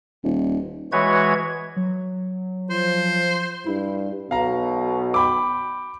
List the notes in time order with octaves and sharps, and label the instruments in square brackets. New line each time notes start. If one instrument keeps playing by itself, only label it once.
[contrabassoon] D#1
[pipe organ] E3 G#3 F#4 B4 C#5 G#6
[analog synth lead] F#3
[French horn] F3 [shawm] C5
[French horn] G2 [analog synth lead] E4
[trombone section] B1 B2 [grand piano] F5 A#5
[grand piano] G5 B5 D6